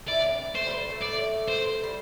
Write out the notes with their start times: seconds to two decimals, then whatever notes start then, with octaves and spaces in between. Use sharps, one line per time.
0.08 E4 D5
0.19 D4
0.31 C4
0.55 A3 C5
0.67 G3
0.78 G3
0.90 A3
1.01 D5
1.48 C5
1.84 G3